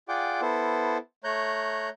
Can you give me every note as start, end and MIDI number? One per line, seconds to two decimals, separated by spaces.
0.08 0.41 65
0.08 0.41 68
0.08 0.41 74
0.08 0.41 78
0.08 0.41 79
0.08 0.41 86
0.42 0.98 59
0.42 0.98 64
0.42 0.98 69
0.42 0.98 72
1.24 1.89 57
1.24 1.89 73
1.24 1.89 82
1.24 1.89 90
1.24 1.89 91